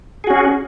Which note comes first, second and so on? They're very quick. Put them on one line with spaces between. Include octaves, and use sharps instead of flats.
G#4 F#4 C#4